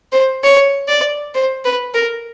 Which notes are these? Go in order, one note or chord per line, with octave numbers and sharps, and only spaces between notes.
C5
C#5
D5
C5
B4
A#4